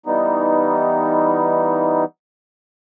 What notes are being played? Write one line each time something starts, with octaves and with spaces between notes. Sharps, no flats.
E3 G3 B3 D#4